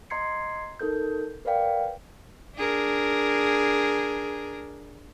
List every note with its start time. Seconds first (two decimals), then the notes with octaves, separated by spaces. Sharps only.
0.10 D#5 A#5 C6 G#6 C7 C#7
0.80 D#4 A4 A#4 G6
1.45 A#4 B4 D5 F5 G5
2.56 D4 G#4 A#4